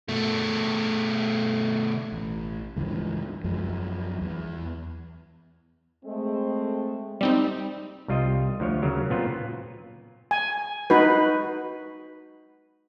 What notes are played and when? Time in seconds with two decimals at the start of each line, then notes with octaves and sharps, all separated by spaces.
0.08 B2 A3
2.12 A1
2.76 C#2 G2 E3 F3
3.44 F#2 F3 G#3
4.21 E2
6.05 G#3 A3 C4
7.21 G3 C4 D#4
8.08 C2 G3 F4 D#5
8.60 D2 F3 C#5
8.82 C#3 F#3 A#4
9.10 A#2 B3 C4 F4 B4
10.31 G#5
10.90 D#4 F#4 B4